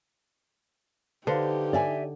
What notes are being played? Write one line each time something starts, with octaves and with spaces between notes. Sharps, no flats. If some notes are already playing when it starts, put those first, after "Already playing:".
D3 D#4 G4 B4 C5 F5
D5 E5 G#5